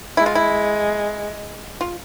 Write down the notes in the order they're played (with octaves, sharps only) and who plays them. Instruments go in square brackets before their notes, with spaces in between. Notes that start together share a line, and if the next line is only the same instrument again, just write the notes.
[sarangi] G#3 [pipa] E4
[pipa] F4
E4
F4